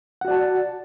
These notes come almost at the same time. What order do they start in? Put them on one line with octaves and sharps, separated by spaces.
F#5 F#4 D5 A5